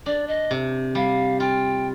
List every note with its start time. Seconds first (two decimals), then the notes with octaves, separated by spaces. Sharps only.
0.06 D4 D5
0.28 D#5
0.51 C3
0.95 G3 F5
1.40 F4 G5